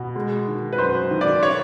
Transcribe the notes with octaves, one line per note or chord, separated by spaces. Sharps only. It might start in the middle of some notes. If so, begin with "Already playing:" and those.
Already playing: B2
G#3
D#3
B4
F#2 C5
D#3
D5
C#5